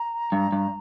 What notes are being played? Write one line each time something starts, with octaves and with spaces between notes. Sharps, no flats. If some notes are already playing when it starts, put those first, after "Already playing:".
Already playing: A#5
G2
G2